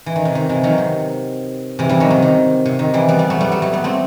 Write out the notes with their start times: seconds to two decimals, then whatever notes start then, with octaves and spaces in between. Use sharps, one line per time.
0.06 E3
0.16 D#3
0.25 C3
0.35 D#3
0.49 C3 E3
0.63 D#3 F#3
0.78 C3
1.79 C3 E3
1.89 E3 G3
2.00 D#3 F#3
2.11 C3
2.22 D#3
2.66 C3
2.79 D#3
2.94 E3 G3
3.08 G3 B3
3.19 G3 B3
3.30 F#3 A3
3.40 G3 B3
3.52 F#3 A3
3.62 F#3 A3
3.73 G3 B3
3.84 A3 C4